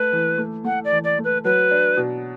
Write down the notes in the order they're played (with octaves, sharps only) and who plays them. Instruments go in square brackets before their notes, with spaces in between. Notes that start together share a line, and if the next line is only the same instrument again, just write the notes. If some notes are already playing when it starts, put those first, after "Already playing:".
Already playing: [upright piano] A3 [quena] B4
[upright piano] E3
A3
[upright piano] A3 [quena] F#5
[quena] D5
[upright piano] E3
[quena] D5
[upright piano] A3
[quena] B4
[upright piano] F#3 [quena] B4
[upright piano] D4
B2